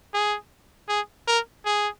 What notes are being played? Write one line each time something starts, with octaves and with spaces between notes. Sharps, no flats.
G#4
G#4
A#4
G#4